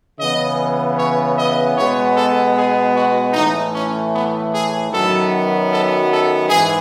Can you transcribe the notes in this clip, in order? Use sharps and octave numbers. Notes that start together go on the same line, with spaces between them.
C#3 E3 B3 D#5
C#5
D#5
B2 G#3 B3 C#5
A4
G#4
F#4
A2 E3 A3 D#4
C#4
B3
G#4
F#2 D#3 F#3 B3 A4
A4
A4
G#2 E3 G#4